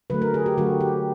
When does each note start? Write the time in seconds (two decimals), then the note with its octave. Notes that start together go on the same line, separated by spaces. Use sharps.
0.10 D3 F#3 A3 B4
0.22 A#4
0.34 G#4
0.46 G4
0.57 D3 F#3 A3 F#4
0.81 G4